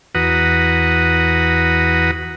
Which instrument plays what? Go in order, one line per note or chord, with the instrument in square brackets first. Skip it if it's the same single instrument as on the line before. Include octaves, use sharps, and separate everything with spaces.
[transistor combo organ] E2 F#4 B4 F#5 A#5 D#6